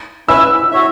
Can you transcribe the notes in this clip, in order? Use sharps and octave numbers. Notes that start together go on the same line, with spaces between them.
C#4 E4 B4 E5 E6
F#4 C#5 E5